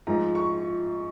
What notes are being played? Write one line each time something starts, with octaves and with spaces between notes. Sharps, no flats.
G#2 F3 G#3 A#5
C#6